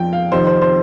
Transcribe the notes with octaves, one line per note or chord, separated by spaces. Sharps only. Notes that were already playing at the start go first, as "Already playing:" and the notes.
Already playing: F2 F3 G5
F5
F2 C3 D#3 C5
C5
C5